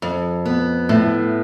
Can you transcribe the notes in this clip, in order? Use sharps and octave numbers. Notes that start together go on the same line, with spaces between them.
F2
B3
A2